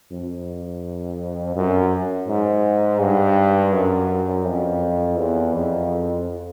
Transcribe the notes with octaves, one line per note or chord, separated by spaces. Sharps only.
F2
F#2
G#2
G2
F#2
F2
E2
F2